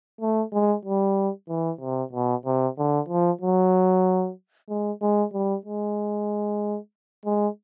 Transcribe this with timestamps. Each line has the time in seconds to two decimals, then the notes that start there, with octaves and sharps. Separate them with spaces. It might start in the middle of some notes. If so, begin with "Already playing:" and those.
0.21 A3
0.53 G#3
0.85 G3
1.49 E3
1.81 C3
2.13 B2
2.45 C3
2.78 D3
3.09 F3
3.41 F#3
4.69 G#3
5.02 G#3
5.33 G3
5.66 G#3
7.26 G#3